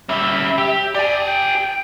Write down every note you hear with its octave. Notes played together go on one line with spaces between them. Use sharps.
G3 C#4 E5
G4
G4 D5 G#5
G5